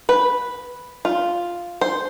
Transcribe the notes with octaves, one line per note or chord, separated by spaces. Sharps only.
B4
F4
C5